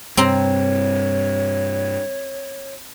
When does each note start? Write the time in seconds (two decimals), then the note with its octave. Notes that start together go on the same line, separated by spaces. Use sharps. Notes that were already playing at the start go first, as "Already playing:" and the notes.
0.17 G2 C3 C4 C#5 A#5